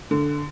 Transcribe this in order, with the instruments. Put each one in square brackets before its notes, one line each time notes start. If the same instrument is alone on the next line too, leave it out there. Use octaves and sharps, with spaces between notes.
[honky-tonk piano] D3